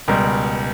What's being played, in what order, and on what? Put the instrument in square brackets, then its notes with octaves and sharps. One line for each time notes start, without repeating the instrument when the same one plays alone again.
[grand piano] C#2 B2 G3 A#4